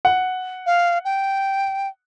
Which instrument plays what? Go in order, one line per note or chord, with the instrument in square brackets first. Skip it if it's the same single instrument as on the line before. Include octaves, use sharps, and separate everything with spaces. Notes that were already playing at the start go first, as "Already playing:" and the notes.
[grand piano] F#5
[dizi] F5
G5